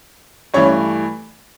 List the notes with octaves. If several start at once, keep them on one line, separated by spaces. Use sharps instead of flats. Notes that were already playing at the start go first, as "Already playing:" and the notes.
G2 E3 A3 C#4 C#5